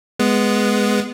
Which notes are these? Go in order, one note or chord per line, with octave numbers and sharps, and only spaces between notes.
G#3 B3